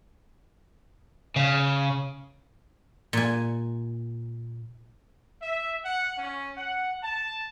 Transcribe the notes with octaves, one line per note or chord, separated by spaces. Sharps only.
C#3
A#2 G#5
E5
F#5
C#4
F#5
A5